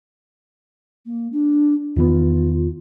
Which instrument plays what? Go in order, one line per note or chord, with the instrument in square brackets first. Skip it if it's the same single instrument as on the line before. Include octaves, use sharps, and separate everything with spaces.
[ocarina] A#3
D4
[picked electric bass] E2 D#3 B3 [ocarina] F4